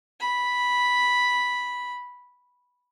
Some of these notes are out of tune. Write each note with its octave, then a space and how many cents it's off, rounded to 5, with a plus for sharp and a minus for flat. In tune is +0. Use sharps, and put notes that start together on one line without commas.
B5 -5